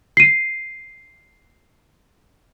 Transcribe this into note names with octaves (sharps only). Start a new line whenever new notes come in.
C7 D#7